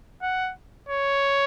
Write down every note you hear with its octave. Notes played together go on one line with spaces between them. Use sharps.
F#5
C#5